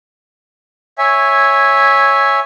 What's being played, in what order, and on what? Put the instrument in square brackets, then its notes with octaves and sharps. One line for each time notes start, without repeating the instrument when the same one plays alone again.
[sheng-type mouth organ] C#5 E5 G#5